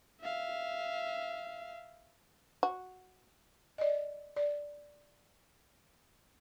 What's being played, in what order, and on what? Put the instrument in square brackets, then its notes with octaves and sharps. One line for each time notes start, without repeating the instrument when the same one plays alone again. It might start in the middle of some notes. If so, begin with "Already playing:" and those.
[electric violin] E5 F5
[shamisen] F#4
[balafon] D5 D#5
D5